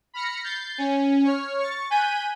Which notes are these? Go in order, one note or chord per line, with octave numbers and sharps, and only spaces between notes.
B5 F6 A#6 C#7
G6 A6 C7
C#4
C#5 F6
C#6 A6
G#5 F#6 G6 B6 D#7